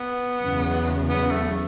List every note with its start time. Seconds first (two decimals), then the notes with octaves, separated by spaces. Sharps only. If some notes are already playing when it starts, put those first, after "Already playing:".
Already playing: B3
0.41 E2 C#3 F#3
1.09 B3
1.31 A3